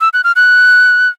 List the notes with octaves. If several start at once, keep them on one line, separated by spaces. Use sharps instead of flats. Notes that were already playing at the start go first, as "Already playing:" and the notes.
E6
F#6
F6
F#6